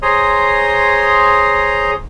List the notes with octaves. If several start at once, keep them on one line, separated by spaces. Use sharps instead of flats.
G#4 C5 C#5 A#5 C6 D#6